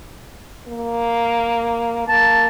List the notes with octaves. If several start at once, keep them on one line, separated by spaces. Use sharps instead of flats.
A#3
A#3 A5